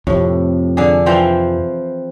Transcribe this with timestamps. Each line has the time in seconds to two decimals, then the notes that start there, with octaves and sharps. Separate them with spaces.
0.07 F2 A2 C3
0.77 D3 G#4
1.06 E3 F3 C4